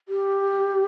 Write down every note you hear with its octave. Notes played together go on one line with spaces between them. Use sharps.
G4